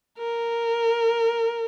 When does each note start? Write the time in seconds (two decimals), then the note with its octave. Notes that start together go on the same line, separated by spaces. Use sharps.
0.18 A#4